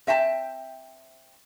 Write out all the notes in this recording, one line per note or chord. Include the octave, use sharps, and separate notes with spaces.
C4 E5 G5 A5